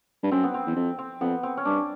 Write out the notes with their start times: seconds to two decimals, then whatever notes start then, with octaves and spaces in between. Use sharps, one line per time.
0.23 G2
0.31 F#2 C4
0.44 B3
0.54 C4
0.67 E2
0.76 F2
0.99 C4
1.21 F2 B3
1.43 C4
1.57 C#4
1.65 G2 D4